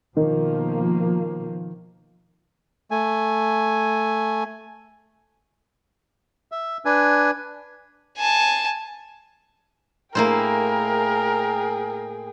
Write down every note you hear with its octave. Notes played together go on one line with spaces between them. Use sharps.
B2 D#3 F3 A#3
A3 G#5
E5
D4 B4 G#5
G#5 A5
A2 A#3 E4 G#4 A#4 C5 G5